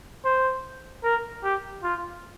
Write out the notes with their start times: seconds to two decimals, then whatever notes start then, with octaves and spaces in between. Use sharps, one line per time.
0.25 C5
1.03 A#4
1.43 G4
1.83 F4